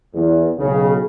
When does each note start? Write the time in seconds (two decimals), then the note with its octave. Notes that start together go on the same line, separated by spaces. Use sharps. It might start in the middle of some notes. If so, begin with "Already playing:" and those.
0.15 E2
0.58 B1 C#3